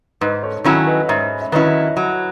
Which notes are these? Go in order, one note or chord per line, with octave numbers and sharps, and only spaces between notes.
G#2 B4 D#5
A4 C#5
D#3 F#3 C#4 E4 A4 C#5
B4 D#5
G#2 C#5 E5
E5
D#3 F#3 C#4 E4 B4 D#5
F#3